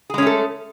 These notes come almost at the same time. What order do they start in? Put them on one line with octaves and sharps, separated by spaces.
G#4 G#3 C#4 A3 A4